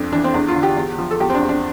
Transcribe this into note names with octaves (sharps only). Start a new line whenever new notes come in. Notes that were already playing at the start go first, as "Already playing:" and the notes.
Already playing: F2 D4
E3 D4
C4
E2 D4
F4
D3
G4
E2
F3
A4
E2 G4
C4
D4
E2
D4